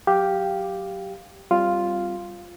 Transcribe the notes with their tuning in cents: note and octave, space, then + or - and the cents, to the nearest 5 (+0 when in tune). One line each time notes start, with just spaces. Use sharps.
F#3 +0 G4 +0 F5 +0
G3 +0 C4 +0 F4 +0